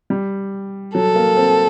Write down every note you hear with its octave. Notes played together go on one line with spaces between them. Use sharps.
G3
F#3 A4
A#3
C4